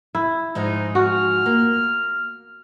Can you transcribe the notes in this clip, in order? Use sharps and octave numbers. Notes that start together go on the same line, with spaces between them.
E4
G#2 F3 G#3 D#4
F#4 F6
A#3